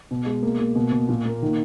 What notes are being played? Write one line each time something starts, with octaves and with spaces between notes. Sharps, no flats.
B2
G#3
A#3
A#3
B2
B2
A#2
A#3
D#3